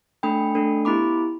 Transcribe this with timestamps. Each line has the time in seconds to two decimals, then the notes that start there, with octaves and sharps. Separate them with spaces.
0.23 A3 D4 A4 G5 B5
0.55 A3 D4 A4
0.85 B3 E4 G4 B5 D6